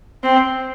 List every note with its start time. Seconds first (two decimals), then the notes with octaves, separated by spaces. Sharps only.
0.23 C4